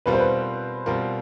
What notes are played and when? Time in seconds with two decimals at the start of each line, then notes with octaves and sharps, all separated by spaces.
0.06 B2 G3 C4 F4 A#4 B4
0.13 C5
0.20 B4
0.86 B2 G3 C4 F4 A#4